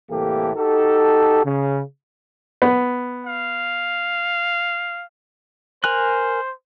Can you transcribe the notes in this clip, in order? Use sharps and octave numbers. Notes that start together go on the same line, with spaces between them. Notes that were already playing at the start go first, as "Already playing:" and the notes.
C2 A2 E3 A#3 G4 A4
D#4 F#4 G4 A4
C#3
B3
F5
A#4 C5 G#5 F#6